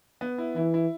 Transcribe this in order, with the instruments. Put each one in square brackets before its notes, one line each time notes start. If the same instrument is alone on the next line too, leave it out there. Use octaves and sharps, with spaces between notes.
[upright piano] B3
E4
[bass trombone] E3 [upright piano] E4
[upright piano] E4